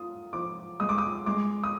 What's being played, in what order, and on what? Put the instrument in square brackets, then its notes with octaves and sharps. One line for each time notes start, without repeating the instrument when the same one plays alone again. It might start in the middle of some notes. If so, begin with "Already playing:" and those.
Already playing: [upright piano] F4 [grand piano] D#6
[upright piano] F3 [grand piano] D6
[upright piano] G#3 [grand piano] D#6
[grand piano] D6
D#6
[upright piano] G#3 [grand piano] D6
[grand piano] D#6